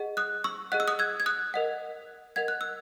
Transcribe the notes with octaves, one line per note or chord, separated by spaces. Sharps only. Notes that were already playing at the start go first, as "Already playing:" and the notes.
Already playing: G#4 D#5 F#5
D#6 F#6
C#6 E6
G#4 D#5 F#5 F#6
E6
D#6 F#6
E6 G#6
G#6
D#6 F#6
A#4 D#5 F#5
A#4 D#5 F#5 G#6
F#6
E6